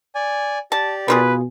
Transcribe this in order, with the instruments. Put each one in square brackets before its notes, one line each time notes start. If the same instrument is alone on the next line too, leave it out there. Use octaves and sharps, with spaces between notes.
[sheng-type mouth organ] D5 G#5
[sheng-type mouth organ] G4 D5 [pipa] A5
[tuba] B2 [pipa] A#3 F4 G#4 [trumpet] B4